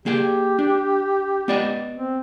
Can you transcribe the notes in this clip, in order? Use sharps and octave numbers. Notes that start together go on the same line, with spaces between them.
A#3 G4 G#4 G5
D4
B3 D5 D#5
C4